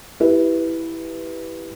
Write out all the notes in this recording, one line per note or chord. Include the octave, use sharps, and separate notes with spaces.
E4 G4 B4